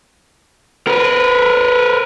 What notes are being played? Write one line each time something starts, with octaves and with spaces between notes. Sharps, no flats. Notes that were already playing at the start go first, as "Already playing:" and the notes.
A#4 B4